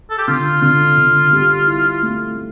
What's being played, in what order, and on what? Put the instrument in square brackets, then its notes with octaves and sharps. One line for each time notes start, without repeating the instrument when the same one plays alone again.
[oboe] A4
G4
[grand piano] D3 [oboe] F4
[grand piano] D3 [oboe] F4
[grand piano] D3
G3
E4
A3